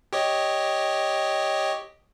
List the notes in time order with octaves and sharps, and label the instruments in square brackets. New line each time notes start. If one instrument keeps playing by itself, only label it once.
[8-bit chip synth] G4 C#5 D#5